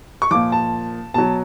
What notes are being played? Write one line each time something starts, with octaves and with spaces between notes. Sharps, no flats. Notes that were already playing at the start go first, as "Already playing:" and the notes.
C#6
A#2 F3 D6
A5
B2 F#3 A5